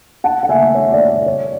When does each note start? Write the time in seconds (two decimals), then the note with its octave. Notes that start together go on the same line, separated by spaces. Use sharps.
0.24 F#5 A5
0.43 F#5
0.49 E5 G#5
0.75 C#5 E5
0.92 D5
1.08 D5
1.26 C#5